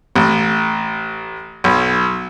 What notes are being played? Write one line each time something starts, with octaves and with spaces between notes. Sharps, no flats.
A1
B1